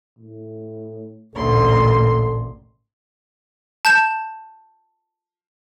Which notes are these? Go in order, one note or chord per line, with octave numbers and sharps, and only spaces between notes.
A2
A1 D2 A#2 A4 C6
A5 G6 E7